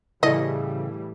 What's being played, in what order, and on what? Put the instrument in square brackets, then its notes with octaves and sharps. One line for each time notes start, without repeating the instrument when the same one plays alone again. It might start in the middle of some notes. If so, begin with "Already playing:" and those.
[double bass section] A2 E3 G3 [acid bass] C#3 [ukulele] E4 A4 D5 [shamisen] D#5